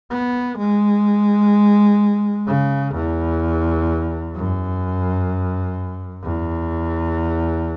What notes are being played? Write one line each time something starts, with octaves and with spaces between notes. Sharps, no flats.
B3
G#3
C#3
E2
F#2
E2